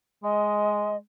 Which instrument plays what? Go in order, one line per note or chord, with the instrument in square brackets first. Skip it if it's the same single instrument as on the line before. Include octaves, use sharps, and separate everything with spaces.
[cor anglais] G#3 [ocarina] D#5